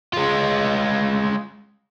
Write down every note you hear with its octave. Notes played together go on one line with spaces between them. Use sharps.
G#3 F4